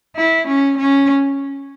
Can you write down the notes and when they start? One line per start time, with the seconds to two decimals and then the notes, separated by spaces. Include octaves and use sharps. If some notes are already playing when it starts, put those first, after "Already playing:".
0.17 E4
0.47 C#4
0.78 C#4